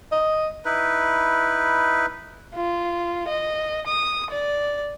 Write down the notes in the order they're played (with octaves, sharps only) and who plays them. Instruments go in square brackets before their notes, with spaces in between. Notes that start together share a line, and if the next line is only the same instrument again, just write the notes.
[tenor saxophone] D#5
[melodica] D#4 E4 B4
[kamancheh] F4
D#5
D#6
D5